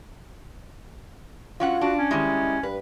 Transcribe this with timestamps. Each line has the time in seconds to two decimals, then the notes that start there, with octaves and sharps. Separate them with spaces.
1.60 F#3 C#4 F4 F#5
1.81 D4 F#4
1.98 C#4
2.11 D#3 G3 G#3 E4
2.63 G2 B4